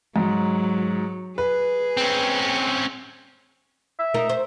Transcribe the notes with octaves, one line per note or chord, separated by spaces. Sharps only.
G#2 F#3
G#4 B4
C4 C#4
E5
D#4 F4 A#4
C5